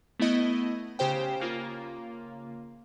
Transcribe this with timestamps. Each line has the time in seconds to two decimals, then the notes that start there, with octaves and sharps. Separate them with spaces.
0.20 A3 B3 E4 D#5
0.99 C#3 G4 C5 G5
1.40 C#3 A#3 F4